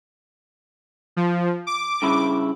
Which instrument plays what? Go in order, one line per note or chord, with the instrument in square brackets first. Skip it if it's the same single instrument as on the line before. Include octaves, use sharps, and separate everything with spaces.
[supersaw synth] F3
D6
[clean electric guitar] G2 C#3 E4